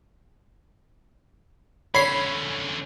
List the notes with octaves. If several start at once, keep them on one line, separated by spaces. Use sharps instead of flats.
D3 C#4 C#5 B5 C7